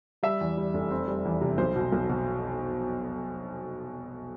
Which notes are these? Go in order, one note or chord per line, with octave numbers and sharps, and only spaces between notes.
G3 E5
E2
G3
F1
C4
G3
E2
C3
B1 C5
B2
B1
B2